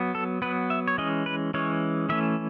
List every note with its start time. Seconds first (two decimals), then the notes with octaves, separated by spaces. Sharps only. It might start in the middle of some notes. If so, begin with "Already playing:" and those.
Already playing: F#3 B3
0.15 A4
0.42 F#3 B3 B4
0.70 E5
0.88 C#5
0.98 E3 G#3 C#4 D#5
1.26 B4
1.54 E3 G#3 C#4 C#5
2.09 E3 A3 C#4 E5